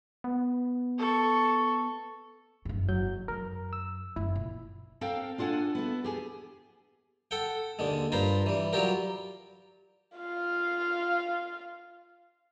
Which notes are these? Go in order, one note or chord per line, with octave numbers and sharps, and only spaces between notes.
B3
A4 C#6
F#1 G#2
F#3 G6
F#2 A#4
E6
F#1 E4
A#2
C4 A4 A#4 F5 G5
D4 F4 A4 F#5 G#5
B3 E4 A4
G4 G#4 G#5
A4 F#5 G5
D#2 D3 G#3
G2 F4 A#4 C5 B5
E3 G3
F#3 G3 F4 G4 A#4
F4 F5